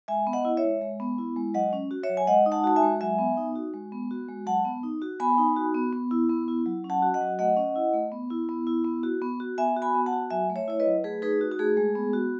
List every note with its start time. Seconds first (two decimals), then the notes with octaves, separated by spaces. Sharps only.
0.08 G#3 E5 G#5
0.27 B3
0.33 D#5 F#5
0.45 E4
0.57 C#5 E5
0.63 G#3
0.81 G#3
1.00 B3
1.18 E4
1.36 G#3
1.54 F#3 D#5 F#5
1.73 C#4
1.91 F#4
2.03 C#5 E5
2.09 F#3
2.17 G#5
2.27 G#3 D#5 F#5
2.46 D#4
2.52 F#5 A5
2.64 F#4 A5
2.76 E5 G#5
2.82 G#3
3.01 F#3 E5 G#5
3.19 B3
3.37 D#4
3.55 F#4
3.74 G#3
3.92 B3
4.11 F#4
4.28 G#3
4.46 F#3 F#5 A5
4.65 B3
4.83 D#4
5.02 F#4
5.20 B3 G#5 B5
5.38 D#4
5.56 F#4
5.74 B3
5.93 B3
6.11 E4
6.29 B3
6.48 E4
6.66 F#3
6.84 C#4
6.90 F#5 A5
7.02 F#4
7.14 D#5 F#5
7.21 F#3
7.39 A3 D#5 F#5
7.57 C#4
7.75 E4
7.93 A3
8.12 B3
8.30 E4
8.49 B3
8.67 E4
8.84 B3
9.03 F#4
9.22 B3
9.40 F#4
9.58 B3 E5 G#5
9.76 F#4
9.82 G#5 B5
9.95 B3
10.06 F#5 A5
10.12 F#4
10.30 F#3 E5 G#5
10.50 A3
10.56 C#5 E5
10.68 E4 C#5
10.80 B4 D#5
10.86 F#3
11.04 A3 G#4 B4
11.22 D#4 G#4 B4
11.41 F#4
11.51 F#4
11.59 A3 G#4
11.77 G#3
11.95 B3
12.13 F#4